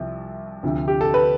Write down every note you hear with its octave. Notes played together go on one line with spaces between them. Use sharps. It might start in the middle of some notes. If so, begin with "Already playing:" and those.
Already playing: C2 C3 F3
D2 C3 F3
G4
A4
B4